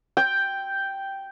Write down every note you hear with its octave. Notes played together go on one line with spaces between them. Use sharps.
G5